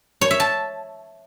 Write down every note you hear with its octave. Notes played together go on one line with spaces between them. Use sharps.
C#5
E5
A5